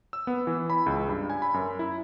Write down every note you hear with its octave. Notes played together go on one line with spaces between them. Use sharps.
E6
B3
E3
B5
C#2
G2
G#5
B5
F#2
E4